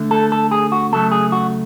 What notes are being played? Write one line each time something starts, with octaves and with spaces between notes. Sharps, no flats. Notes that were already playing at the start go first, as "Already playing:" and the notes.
Already playing: D3 A3
A4
A4
G#4
F#4
C#3 F#3 A3 A4
G#4
F#4